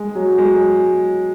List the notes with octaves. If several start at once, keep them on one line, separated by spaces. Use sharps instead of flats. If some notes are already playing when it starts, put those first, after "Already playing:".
Already playing: G#3
F#3
G#3